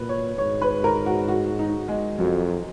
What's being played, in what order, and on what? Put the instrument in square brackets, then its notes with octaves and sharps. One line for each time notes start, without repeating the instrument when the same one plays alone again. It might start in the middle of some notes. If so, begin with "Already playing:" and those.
Already playing: [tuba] A#2 [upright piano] B4
[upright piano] C#5
[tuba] G#2 [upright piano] C#5
[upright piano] B4
A#4
F#4
F#4
D#4
G#3
[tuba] F2 [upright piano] F#3